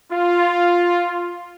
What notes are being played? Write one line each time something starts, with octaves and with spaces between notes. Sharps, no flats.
F4